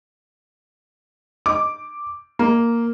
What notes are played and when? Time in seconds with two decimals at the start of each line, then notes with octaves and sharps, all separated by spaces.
1.46 D6
2.39 A#3